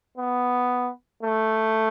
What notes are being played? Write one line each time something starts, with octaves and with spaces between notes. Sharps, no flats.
B3
A3